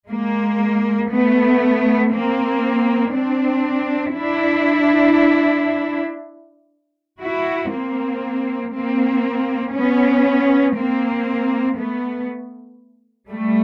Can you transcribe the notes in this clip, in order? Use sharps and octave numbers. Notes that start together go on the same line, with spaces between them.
G#3 A#3
A3 B3
A#3 C4
C4 D4
D4 E4
E4 F#4
A#3 C4
A#3 C4
B3 C#4
A#3 C4
A3 B3
G3 A3